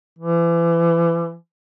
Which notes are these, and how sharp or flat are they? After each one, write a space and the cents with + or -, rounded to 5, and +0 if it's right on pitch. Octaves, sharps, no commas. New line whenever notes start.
E3 +35